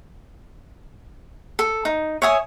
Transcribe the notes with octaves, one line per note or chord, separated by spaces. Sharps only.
A4
D#4
C#5 E5 G#5 D#6